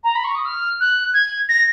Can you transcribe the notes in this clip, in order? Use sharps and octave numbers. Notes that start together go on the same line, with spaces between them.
A#5
B5
C#6
D#6
F6
F#6
G#6
A#6